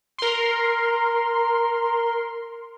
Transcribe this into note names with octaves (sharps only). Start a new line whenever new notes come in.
A#4 C6